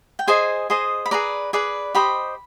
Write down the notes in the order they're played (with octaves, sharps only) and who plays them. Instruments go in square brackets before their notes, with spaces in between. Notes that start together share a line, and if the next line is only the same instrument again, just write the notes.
[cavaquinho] G5
G#4 C5 D#5 G#5
G#4 C5 D#5
B5
G#4 B4 D5 A#5
G#4 B4 D5
G4 C5 D#5 B5